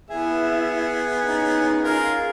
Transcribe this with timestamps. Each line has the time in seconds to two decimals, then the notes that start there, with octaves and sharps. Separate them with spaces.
0.10 B3 E4 G#4 E5
1.24 C#4 D#4
1.84 F4 G#4 A#4